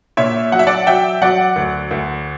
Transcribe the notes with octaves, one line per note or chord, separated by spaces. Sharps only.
A#2 C#5 E5
F#3 F#5
E5
D5 F#5
F#3 E5 G5
F#3 D5 F#5
D2
D2